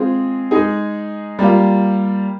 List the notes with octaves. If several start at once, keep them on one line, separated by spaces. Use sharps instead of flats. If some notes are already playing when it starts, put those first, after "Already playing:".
Already playing: G#3 C4 F4 G#4
G#3 D#4 G#4
G3 A#3 F4